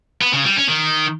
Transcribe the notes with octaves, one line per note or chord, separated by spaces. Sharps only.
B3
C#3
G3
C#4
D#3